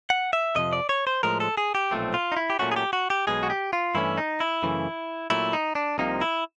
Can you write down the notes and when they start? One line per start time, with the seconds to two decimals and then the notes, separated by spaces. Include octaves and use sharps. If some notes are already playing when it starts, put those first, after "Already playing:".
0.10 F#5
0.33 E5
0.56 F2 C3 F3 D#5
0.73 D5
0.89 C#5
1.07 C5
1.23 A2 F3 G#3 A#4
1.40 A4
1.57 G#4
1.75 G4
1.91 B1 A#2 F3 A3 C4
2.14 F4
2.32 D#4
2.37 E4
2.50 G4
2.59 A#2 F#3 A3 C#4 F#4
2.72 G#4
2.76 G4
2.93 F#4
3.10 G4
3.27 B1 B2 G#3 G#4
3.43 F#4
3.50 G4
3.73 F4
3.95 G2 E3 A3 C#4 E4
4.18 D#4
4.40 E4
4.63 F#2 C#3 E3 A3
5.30 A#2 F#3 A3 E4
5.53 D#4
5.75 D4
5.98 C2 C3 F3 A#3 D#4
6.21 E4